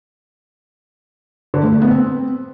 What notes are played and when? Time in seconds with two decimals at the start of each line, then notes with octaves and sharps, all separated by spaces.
1.54 D3
1.63 A2
1.72 A3
1.82 B3
1.91 C4